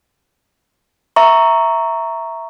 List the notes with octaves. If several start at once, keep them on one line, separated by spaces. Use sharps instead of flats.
E5 A#5 C#6